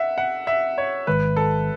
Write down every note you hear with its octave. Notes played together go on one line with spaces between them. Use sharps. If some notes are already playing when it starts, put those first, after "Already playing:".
Already playing: E5 F#5
F#5
E5
C#5
A1 G#2 D#3 G#3 B4
A4